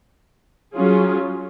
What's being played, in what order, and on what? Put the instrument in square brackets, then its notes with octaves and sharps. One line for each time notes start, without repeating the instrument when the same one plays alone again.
[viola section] F#3 C#4 F4 G#4